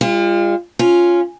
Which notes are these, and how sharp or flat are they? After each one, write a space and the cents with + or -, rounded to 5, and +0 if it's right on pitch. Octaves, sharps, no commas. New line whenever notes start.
G3 +45 F4 -25
C#4 +0 F4 +0